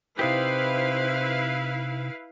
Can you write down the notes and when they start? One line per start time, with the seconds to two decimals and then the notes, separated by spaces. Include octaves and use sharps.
0.19 C3 D#4 E4 G4 B4 C5 F5